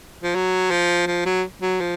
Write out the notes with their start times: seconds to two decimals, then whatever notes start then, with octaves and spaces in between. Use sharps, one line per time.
0.23 F3
0.35 F#3
0.71 F3
1.07 F3
1.26 F#3
1.62 F#3
1.80 F3